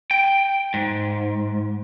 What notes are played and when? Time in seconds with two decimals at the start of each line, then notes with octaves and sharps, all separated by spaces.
0.11 G5
0.74 G#2